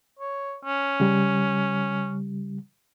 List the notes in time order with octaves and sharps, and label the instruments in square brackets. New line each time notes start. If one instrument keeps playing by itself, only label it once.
[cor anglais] C#5
C#4
[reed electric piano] C#3 G3